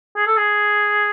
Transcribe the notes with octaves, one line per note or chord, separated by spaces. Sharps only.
G#4
A4
G#4